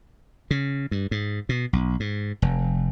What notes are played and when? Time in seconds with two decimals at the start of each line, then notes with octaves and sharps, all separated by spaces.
0.51 C#3
0.91 G2
1.11 G#2
1.49 B2
1.73 B1
2.00 G#2
2.42 F1